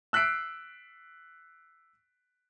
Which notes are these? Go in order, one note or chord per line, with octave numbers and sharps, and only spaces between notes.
E6 F#6 B6 C7 D7